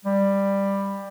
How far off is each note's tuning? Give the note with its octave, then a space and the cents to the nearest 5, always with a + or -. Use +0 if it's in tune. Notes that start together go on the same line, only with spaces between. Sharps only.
G3 +10